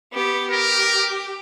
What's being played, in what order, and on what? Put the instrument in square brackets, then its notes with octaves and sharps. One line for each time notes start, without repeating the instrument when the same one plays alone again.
[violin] B3 G4
[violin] G4 [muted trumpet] A#4